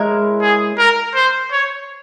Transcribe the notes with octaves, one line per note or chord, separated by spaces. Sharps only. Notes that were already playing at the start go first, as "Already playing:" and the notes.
Already playing: G#3 E4 A#4 C#5
G#4
A#4
C5
C#5